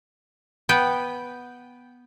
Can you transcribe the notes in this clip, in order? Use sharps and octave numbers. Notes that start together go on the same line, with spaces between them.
B3 B4 G5